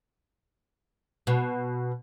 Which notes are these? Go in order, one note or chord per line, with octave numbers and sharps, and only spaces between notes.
B2